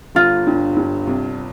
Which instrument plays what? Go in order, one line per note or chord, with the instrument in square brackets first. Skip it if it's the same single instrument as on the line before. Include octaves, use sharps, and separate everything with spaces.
[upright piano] G1 [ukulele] F4
[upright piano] G2
G2
C2